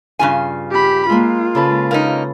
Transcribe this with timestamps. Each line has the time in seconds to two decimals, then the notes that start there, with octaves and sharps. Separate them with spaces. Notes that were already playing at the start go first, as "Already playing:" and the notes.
0.19 G2 C#3 F4 G#5
0.71 G4 B5
1.10 G#3 A#3 F4
1.55 C#3 A4 B4
1.91 A#3 C#4 D#4